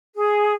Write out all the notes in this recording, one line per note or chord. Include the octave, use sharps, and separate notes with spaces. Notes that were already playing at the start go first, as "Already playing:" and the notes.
G#4